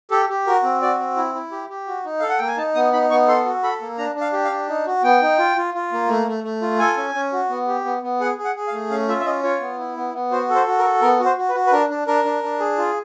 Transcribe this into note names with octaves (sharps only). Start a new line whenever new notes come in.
G4 A4
G4
F#4 A#4
C4
F#4 D5
C4
E4
E4
G4
G4
F#4
D#4
A4 F5
F#5
A#3 G5
G#5
D#4 A5
B3 D#6
D#4 B5
B3 C#6
A4 C6
F#4
A4 B5
A#3
D4 A#5
D4
F5
G4
F5
D4
D#4
F#4
B3 G5
D#4
F4
F4
F4
A#3
A3
A3
A3
F4
A4 G#5
C#4
C#4
F#4
B3
G4
B3
B3
G#4 F#5
G#4
F#5
G#4
F5
A3
C#4 F5
F4 E5
E5
C#4 D#5
F4 C#5
B3
E4
B3
B3
F#4 C5
A4
C5
F#4
A#4
A4
B3 A#4
F#4
C5
F#4
B4
F#4
B4
D4 A#4
D4
D4 A#4
D4
D4
G#4
F4